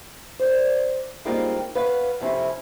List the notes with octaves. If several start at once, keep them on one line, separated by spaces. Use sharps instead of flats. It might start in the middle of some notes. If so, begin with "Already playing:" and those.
C5 D5
G3 G#3 A#3 C4 D#4 F4
B4 C#5 F5 F#5
F2 C3 C#4 E4